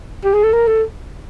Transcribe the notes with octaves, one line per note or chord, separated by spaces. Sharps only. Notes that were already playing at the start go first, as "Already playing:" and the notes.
G4
G#4
A4
A#4
A4